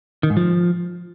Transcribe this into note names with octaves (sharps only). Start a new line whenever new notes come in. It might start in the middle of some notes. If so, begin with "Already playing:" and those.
D#3
G#2
F3